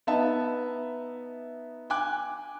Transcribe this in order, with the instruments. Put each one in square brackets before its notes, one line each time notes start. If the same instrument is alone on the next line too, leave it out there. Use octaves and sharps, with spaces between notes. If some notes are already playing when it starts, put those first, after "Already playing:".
[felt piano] B3 D#4 E5 A5
G5 G#5 D6 F#6